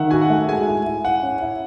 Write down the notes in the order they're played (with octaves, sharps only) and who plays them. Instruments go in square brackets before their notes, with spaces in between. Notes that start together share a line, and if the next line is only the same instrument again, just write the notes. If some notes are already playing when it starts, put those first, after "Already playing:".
Already playing: [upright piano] D#3 [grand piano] E5 F#5
[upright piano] F#4 [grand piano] G#5
[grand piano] F#5
[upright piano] A3
[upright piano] G#3 [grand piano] G#5
[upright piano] E4
E4
[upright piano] E4 [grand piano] F#5
[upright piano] C#4
E4